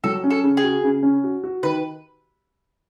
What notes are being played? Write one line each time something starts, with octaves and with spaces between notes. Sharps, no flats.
F#3 A4
C#4
A4
C#3
G#4
F#4
C#3
C#4
F#4
F#4
D#3 B4